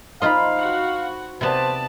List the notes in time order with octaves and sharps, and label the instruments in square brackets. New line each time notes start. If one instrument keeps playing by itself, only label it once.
[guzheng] D#4 F4 D#5 [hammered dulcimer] C5 B5 [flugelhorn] F5
[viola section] F#4 F#5
[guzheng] C3 B3 [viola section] B4 D5 A5 [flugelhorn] C5